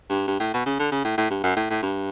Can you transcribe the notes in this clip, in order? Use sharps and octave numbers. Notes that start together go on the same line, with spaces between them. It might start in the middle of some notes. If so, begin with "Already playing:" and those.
G2
G2
A2
B2
C#3
D3
C#3
A2
A2
G2
F#2
A2
A2
G2